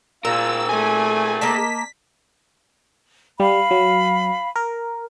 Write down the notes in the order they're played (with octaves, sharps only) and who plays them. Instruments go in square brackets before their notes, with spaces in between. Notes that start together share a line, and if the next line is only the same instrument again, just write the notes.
[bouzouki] A#2 [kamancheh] F4 [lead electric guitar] G#4 A#4 [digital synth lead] E6
[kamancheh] A3 [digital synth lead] G#5
[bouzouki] A#3 D#5 A5 [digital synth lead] B6
[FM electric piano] G3 [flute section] F5 B5
[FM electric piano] F#3
A#4